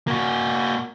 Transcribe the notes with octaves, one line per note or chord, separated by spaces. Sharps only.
A#3 F#4